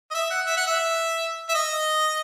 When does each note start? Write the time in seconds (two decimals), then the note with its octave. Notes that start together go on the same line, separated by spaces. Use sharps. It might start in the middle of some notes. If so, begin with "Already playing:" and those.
0.11 D#5
0.15 E5
0.30 F#5
0.46 E5
0.57 F#5
0.67 E5
1.49 E5
1.54 D#5